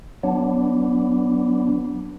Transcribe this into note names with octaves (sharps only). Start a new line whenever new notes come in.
F#3 B3 D4